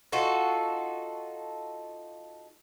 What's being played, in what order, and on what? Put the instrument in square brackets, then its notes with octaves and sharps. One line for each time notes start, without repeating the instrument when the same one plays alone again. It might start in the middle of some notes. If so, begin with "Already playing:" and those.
[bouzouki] D#4 F4 F#4 A4